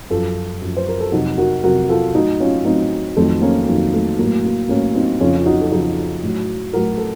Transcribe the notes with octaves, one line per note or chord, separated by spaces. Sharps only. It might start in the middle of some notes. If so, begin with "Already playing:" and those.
F#2 F3 F4 A4
F#2 F3
C5
A#4
A4
F2 C3 F#3 D#4 F#4
F#4 A#4
F2 C3 F#3 F#4 A#4
F4 A4
A2 F#3 D#4 F#4
C#4 F4
A2 F#3 C4 D#4
F2 D#3 F#3 A3 C4
A#3 C#4
F2 D#3 F#3 A#3
A3
A2 F#3 A#3
A#3
A2 F#3 A#3 C#4
C4 D#4
F2 C#3 F3 C#4 F4
F4
D#4 F#4
A4
F2 C#3 F3 D#4 F#4
A2 F#3
A2 F#3 F#4 A#4
A4